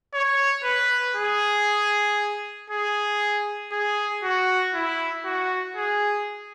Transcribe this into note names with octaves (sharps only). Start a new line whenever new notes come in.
C#5
B4
G#4
G#4
G#4
F#4
E4
F#4
G#4